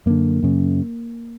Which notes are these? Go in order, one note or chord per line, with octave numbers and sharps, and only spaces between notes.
F#2 D3 A#3
F#2 C#3